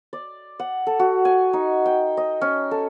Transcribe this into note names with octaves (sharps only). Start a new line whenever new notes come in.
D5
F#5
A4
F#4
G#5
D#4
G5
D#5
C#4
A4